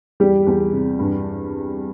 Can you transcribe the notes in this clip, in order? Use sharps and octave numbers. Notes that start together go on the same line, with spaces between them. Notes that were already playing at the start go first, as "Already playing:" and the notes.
E2 G3 G4
E2
C3
G2